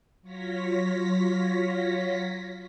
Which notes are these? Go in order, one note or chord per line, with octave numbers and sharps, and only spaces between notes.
F#3 F4 C#5 A#6 B6